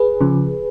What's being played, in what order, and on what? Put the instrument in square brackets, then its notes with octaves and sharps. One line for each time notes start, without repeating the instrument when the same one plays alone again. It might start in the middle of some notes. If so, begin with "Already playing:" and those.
Already playing: [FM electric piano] G#4 B4
C#3 F3